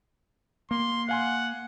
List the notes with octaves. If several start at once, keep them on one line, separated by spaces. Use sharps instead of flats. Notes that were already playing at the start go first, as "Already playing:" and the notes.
A#3 C6
F5 F#5 G#5 C6